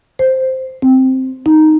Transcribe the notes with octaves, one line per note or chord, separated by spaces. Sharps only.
C5
C4
D#4